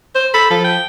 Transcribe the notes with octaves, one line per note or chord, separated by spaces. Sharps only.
C5
A4 B5
F3 A4
G5